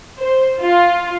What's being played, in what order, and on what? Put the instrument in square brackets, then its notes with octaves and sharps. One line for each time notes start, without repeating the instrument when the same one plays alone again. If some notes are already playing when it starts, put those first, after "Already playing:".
[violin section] C5
F4